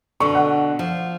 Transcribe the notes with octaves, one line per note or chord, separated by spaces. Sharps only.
B2 D3 C#6
F#5
F3